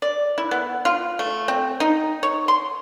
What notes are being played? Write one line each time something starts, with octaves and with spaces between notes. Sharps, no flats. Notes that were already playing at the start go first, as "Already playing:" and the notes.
D5
E4
B3
F4
A3
C4
D#4
C#5
C6